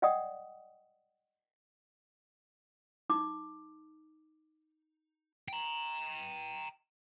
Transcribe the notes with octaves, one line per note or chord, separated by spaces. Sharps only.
D5 D#5 F#5 G5 D6 D#6
D#4 D6
G5 A#5